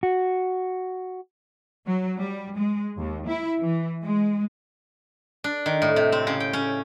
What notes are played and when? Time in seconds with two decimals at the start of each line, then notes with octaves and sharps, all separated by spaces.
0.03 F#4
1.86 F#3
2.18 G3
2.55 G#3
2.98 D#2
3.28 E4
3.60 E3
4.02 G#3
5.44 D4
5.66 D#3
5.82 A2
5.96 C3
6.12 C4
6.27 C#3
6.40 G5
6.53 C#4